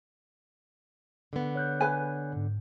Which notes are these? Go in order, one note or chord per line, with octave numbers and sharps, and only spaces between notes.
D3 B3
C#5 F#6 G6
B4 G#5
G#2